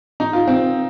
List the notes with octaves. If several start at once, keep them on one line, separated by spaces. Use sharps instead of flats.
D#4
F4
C4